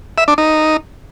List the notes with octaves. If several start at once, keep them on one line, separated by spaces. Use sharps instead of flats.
E5
D4
D#4